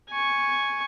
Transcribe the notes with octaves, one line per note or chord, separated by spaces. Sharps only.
G#5 C#6